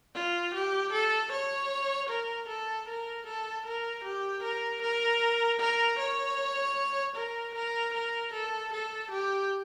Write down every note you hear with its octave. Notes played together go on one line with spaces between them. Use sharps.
F4
G4
A4
C#5
A#4
A4
A#4
A4
A#4
G4
A#4
A#4
A#4
C#5
A#4
A#4
A#4
A4
A4
G4